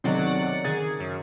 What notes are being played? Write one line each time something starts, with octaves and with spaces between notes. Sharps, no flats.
B1 C3 D#3 F#3 A3 C5 D5 F#5
D#3 C#4 G#4 A#4 A6
F#2